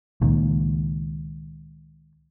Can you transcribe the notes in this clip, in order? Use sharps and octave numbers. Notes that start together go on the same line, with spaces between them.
C#2 A#2 D#3